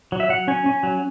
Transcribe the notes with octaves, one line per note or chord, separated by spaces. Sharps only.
F#3
E5
F#3 F#5
C#4 G#5
C#4
F#3